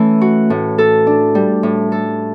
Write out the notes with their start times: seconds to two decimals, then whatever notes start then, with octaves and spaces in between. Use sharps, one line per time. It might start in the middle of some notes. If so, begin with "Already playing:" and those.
Already playing: E3 A3 C#4
0.21 F#4
0.50 A2
0.78 A4
1.07 D4
1.35 G3
1.63 A2
1.92 A4